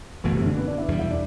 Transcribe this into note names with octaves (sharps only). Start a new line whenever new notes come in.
G1 F#2 B2 E3 A3
C3
D3
B3
D4
E4
E2 B2 G3
E4
D4